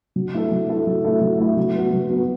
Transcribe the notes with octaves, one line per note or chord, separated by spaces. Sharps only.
F#3
A3 E4 A4
F#3
A3 E4 A4
F#3
A3 E4 A4
F#3
A3 E4 A4
F#3
B3 F#4
F#3
B3 F#4